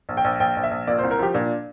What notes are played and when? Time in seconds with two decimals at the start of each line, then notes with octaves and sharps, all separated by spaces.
0.09 A#1
0.17 G5
0.24 A#1
0.40 A#1 G5
0.57 A#1
0.64 E5
0.71 A#1
0.87 A#2 D5
0.99 C2 C5
1.11 A#4
1.19 F3 G4
1.34 A#2 D4